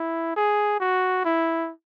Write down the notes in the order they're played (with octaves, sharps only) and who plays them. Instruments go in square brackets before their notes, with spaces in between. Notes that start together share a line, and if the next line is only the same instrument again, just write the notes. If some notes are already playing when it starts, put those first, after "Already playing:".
Already playing: [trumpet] E4
G#4
F#4
E4